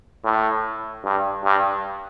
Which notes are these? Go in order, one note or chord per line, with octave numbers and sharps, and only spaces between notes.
A2
G2
G2